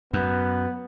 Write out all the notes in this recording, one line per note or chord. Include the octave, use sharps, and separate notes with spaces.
F#2 B3